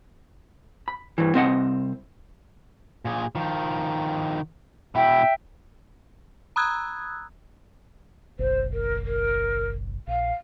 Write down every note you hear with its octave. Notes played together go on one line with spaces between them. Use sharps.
B5
G2 E3
C2 C4 D#5 F#5
A#2 G#4
D#3 F3
B2 E4 E5 G5
A#5 B5 D#6 E6 F#6 G#6
F#1 B1 C5
A#4
A#4
A#1 F5